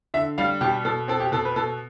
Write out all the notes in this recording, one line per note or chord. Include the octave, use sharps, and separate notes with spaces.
D3 E5
G3 F5
B2 G4
B2 A4
C4 A4
G4
B2 A4
B4
B2 A4